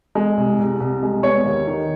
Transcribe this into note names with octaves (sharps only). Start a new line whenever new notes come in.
G#3
C2
C2
C2
G#3
B3 C#5 C#6
D#2
D#3